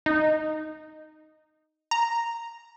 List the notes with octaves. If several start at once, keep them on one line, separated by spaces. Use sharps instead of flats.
D#4
A#5